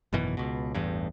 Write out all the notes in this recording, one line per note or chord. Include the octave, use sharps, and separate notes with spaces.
G#1 F#2 B2 E3
C#2 B2
A1 E2 G2